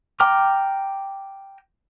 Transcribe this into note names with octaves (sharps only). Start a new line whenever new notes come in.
G5 A#5 D6 F6